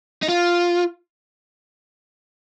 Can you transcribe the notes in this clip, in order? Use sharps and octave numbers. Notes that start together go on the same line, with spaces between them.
D#4
F4